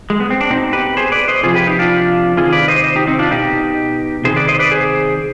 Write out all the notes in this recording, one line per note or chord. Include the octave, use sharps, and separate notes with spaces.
G#3
B3
C4
D4
B2 C4 D#4
G4 B4
G#4 C5
B4 D5
C5 D#5
C3 F3 F4 G#4
G4 B4
D#4 G4
D4 F4
C3 D#3 F4 G#4
B4 D5
C5 D#5
C5 D#5
D#4 G4
C4 D#4
D4 F4
B2 D#4 G4
C3 D#3 G#4 C5
B4 D5
C5 D#5
B4 D5
G#4 C5